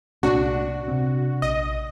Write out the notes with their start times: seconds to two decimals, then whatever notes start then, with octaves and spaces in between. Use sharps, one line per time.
0.23 C2 A#2 D4 F#4
0.88 C3 C4
1.42 A#1 D#5